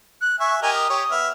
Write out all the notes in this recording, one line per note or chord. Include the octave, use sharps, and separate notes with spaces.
F#6
E5 G#5 C#6
G4 A#4 D#5 G#5
D#6
G4 C#5
B3 E5 F6